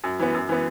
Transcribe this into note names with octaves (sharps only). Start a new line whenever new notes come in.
F#2
E3 B3
F#2
E3 B3